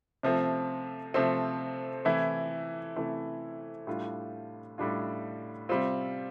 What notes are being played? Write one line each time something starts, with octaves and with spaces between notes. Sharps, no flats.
C3 F3 A3 C4
C3 F3 A3 C4
C3 E3 A3 E4
C3 E3 A3 E4
A2 G3 D4 F4
A2 G3 D4 F4
C3 G3 C4 F4